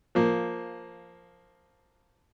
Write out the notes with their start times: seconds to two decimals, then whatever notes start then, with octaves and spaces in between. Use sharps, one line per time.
0.15 F3 A#3